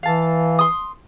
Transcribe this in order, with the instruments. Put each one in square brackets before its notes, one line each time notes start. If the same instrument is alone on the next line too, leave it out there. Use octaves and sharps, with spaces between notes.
[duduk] E3 [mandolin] F5 A5
[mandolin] C6 D#6